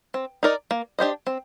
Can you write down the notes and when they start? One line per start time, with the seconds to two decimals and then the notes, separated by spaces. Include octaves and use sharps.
0.14 C4
0.43 D#4 A#4 D5
0.71 A#3
0.99 D4 G4 C5 D#5
1.27 C4